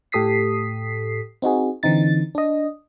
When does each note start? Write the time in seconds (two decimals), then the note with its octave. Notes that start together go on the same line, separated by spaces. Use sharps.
0.12 A2 G4 A4 D#6 B6 C7
1.42 C4 D#4 F#4 G#4
1.83 D3 E3 C4 D#4 A6
2.35 D4 D#5